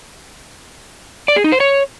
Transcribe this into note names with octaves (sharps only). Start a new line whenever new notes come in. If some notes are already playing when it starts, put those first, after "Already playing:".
D5
G#4
D#4
C5
C#5